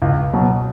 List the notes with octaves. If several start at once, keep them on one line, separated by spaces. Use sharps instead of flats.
C#2
B2 F#3